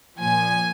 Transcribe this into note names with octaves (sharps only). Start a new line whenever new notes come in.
A#2 F3 G#5